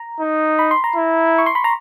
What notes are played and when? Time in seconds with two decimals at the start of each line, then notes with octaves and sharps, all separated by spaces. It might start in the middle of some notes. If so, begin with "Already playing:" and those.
Already playing: A#5
0.20 D#4
0.59 B5
0.71 C6
0.84 A#5
0.96 E4
1.38 C#6
1.46 C6
1.55 B5
1.64 A#5